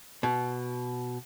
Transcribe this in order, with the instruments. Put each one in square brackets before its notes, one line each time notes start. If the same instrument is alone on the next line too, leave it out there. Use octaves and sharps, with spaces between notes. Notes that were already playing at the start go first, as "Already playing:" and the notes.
[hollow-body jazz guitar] B2